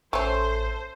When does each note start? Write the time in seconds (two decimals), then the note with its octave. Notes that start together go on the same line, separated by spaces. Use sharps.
0.13 A1 A3 C#4 A4 C5